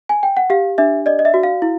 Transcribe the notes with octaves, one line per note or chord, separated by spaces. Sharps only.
G#5
G5
F#5
G4 F5
D4 E5
D5 D#5
D#5
E5
F#4
F5
E4